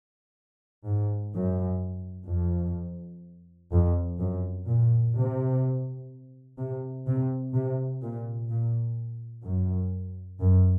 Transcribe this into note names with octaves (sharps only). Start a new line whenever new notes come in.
G#2
F#2
F2
F2
F#2
A#2
C3
C3
C3
C3
A#2
A#2
F#2
F#2